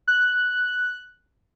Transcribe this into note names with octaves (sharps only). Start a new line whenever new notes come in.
F#6